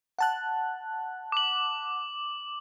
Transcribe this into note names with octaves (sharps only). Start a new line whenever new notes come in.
F#5 A5 F#6
D6 F#7